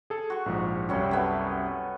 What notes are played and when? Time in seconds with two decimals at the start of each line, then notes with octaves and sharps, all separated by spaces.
0.10 G#4 A4
0.30 F#4 C#6
0.46 A#1 G#2 F3
0.89 C2 F#2 G3 C#4 F#4
1.11 A3 B3 G#5